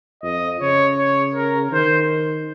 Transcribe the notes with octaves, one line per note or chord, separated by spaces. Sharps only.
F2 D#5
C#3 C#5
C#5
A#4
D#3 C5